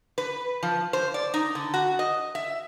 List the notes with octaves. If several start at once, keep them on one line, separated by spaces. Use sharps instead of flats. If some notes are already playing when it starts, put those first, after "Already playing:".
B4
F3
C5
D5
D#4
D3
F#4
D#5
E5